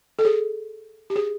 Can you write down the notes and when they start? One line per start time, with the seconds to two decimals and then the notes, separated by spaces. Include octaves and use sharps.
0.19 A4
0.25 G#4
1.10 G4
1.16 G#4